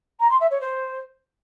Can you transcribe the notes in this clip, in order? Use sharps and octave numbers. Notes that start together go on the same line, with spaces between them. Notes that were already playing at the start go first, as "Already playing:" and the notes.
A#5
C6
E5
C#5
C5